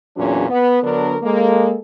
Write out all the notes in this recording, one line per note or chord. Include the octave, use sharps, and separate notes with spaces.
E2 A#2 F#3 C#4 D4 G#4
B3
D3 F#3 B3 D4 A#4
G#3 A#3 A4